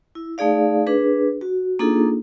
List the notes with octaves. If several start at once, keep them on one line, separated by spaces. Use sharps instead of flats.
E4
A3 D#4 G#4 D5 F5
D4 G#4 B4
F#4
A#3 D4 D#4 F4 G#4 A4